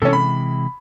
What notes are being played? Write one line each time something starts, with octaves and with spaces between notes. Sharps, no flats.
C3 E3 G#3 C#4 A4
B5